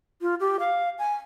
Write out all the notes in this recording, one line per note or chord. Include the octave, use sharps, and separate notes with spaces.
F4
G4
F5
G#5